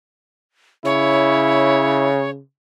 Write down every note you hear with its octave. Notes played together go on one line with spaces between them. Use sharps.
C#3 E4 C#5